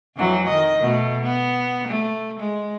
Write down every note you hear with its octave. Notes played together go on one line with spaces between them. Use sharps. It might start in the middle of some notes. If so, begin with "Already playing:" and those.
F2 E3 F#3
D#3 D#5
B2 A3
B3
A3
G#3